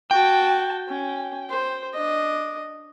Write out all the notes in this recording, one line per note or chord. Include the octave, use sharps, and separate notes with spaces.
F#4 G5 A5
C#4
C5
D4 D#5